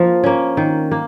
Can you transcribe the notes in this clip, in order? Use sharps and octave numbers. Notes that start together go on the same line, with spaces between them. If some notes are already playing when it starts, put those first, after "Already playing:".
Already playing: F3 A#3
A#3 C#4
D#3
A#3